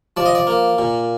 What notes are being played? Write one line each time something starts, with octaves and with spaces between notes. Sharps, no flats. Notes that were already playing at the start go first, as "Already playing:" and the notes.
F3 D5
D#5
D5
A#3
A#2